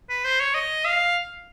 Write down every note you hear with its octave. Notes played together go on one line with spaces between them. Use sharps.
B4
C5
C#5
D#5
F5